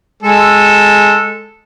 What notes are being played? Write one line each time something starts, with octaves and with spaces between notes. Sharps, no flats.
G#3 A4